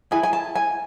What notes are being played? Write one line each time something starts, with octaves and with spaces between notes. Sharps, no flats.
E4 G#4 G#5
G#5
A5
G#5